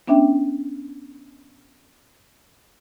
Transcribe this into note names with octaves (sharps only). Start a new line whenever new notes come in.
B3 C#4 D4 E5 G5